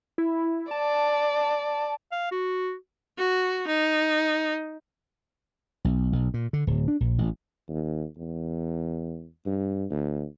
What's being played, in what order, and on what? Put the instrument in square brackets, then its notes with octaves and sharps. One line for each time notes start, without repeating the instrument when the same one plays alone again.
[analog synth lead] E4
[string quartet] D5 [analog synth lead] A5
[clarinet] F5
F#4
[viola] F#4
D#4
[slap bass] B1
B1
A#2
D3
D1
D4
A#1
A1
[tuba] D#2
E2
G2
D2